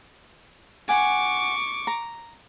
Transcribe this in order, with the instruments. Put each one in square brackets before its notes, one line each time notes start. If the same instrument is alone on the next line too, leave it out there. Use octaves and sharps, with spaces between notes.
[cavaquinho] F#5 G#5 [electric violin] C#6 D6
[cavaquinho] A#5